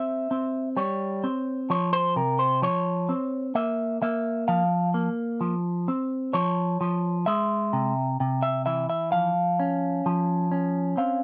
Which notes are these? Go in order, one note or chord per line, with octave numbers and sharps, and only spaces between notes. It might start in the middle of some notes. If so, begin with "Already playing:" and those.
Already playing: C4 E5
C4
G3 C#5
C4
F3 C#5
C5
C3 A#4
C5
F3 C#5
C4
A#3 E5
A#3 E5
F3 F5
A#3
F3
C4
F3 C#5
F3
G#3 E5
C3
C3
E5
E3 E5
E5
F3 F5
C#4
F3
C#4
C4 F5